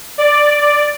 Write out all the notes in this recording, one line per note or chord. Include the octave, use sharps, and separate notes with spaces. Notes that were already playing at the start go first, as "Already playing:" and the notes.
D5